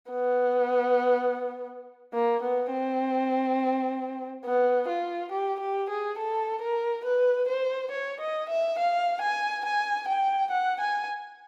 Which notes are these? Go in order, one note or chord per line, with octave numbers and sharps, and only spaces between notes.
B3
A#3
B3
C4
B3
F4
G4
G4
G#4
A4
A#4
B4
C5
C#5
D#5
E5
F5
G#5
G#5
G5
F#5
G#5